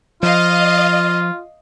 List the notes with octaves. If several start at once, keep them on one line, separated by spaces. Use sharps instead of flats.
F3 F4 D#5 F5